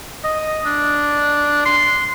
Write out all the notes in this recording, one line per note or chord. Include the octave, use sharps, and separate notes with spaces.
D#5
D4
C6